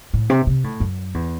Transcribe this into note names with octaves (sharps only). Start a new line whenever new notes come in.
A2
C3
C3
A2
F#2
E2